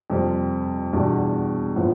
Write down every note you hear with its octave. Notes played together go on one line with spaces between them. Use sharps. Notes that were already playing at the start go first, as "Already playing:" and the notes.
F2 C3 G3 C4
E2 B2 G3 D4
A2 F3 B3